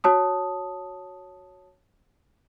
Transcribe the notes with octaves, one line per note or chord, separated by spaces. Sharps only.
F#4 C#5 A5 D#6